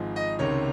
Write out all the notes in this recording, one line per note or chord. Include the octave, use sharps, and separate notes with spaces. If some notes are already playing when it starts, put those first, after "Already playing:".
Already playing: G#1 G#2 F3 G#3
D#5
C#2 C3 D#3 C#5